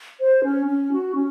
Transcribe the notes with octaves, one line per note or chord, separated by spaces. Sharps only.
C5
C#4
C#4
F#4
C#4